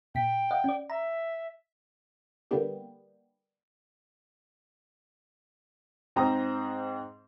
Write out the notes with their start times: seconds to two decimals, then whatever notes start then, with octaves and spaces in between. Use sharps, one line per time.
0.15 A#2 G5 B6
0.51 D#5 F5 F#5
0.64 C#4 D5
0.90 E5 A#5
2.51 D3 G3 A#3 B3 D4 G4
6.16 G#2 C4 C5 A#5 D#6